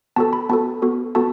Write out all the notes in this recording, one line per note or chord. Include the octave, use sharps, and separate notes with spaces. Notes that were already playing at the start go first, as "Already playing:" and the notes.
B3 F#4 A4 A5
B5
B3 F#4 A4 A5
B3 F#4 A4
B3 F#4 A4 A5